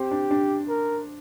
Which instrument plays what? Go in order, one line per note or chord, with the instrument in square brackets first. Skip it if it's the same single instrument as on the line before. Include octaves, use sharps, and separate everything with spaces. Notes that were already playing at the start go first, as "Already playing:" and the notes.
Already playing: [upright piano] C4 [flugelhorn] G4
[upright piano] D4
D4
[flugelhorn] A#4